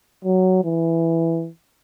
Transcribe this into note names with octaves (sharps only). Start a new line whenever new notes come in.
F#3
E3